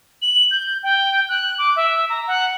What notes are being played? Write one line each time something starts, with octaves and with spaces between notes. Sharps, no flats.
F#7
G6
G5
F#6
D6
E5
A#5
F#5